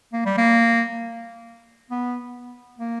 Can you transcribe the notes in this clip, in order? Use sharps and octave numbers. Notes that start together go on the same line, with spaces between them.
A#3
G3
A#3
B3
A#3